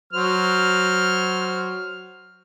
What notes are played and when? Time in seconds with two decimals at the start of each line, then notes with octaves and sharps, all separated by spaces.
0.13 F#3 C5 F6